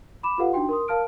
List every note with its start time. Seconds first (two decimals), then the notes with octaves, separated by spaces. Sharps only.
0.23 B5 D6 E7
0.38 F4 G4 A4 B4 F5 F#5
0.53 D4 D#4 F#4 G5 C6
0.69 A#4 C6 D#6
0.88 A#4 F5 A5 F6 D7